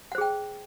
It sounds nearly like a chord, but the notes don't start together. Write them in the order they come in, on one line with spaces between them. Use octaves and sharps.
F#5 C5 G#4 G5